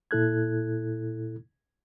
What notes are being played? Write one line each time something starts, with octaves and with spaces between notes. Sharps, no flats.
A#2 E4 A4 F#6 G#6